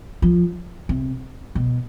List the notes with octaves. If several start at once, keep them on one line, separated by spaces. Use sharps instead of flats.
F3
C3
B2